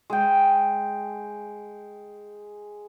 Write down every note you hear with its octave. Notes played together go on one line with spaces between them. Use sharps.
G#3 G5